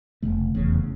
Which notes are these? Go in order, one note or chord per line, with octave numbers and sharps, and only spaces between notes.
F1 E2 C#3 A3
F1 E2 C#3